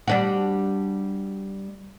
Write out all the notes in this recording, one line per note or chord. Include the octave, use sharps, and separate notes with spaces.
G3 D4 F#4